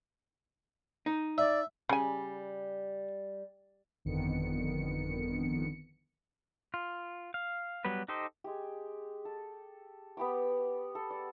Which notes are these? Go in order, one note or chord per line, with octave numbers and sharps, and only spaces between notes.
D#4
D5 E5
C#3 G3 G#5
G1 F2 D3 D#3 B3 C#7
F4
F5
F#3 G3 B3 B4
D#4 G4 A4 C5 D#5
G#3 G4
A4
B3 G4 B5 D6
A4
D5